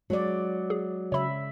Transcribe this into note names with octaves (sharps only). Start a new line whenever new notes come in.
F#3 G#3 D5
G#4
C#3 C#5 E5 B5